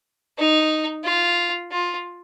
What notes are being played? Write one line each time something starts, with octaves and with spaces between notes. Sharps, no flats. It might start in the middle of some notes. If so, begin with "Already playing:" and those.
D#4
F4
F4